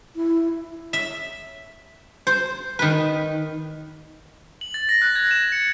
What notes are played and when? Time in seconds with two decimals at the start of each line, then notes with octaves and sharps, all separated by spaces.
0.16 E4
0.93 E5
2.27 C5
2.79 D#3 B4
4.61 F#7
4.74 A6
4.89 A#6
5.01 F#6
5.16 G#6
5.31 E7
5.52 C#7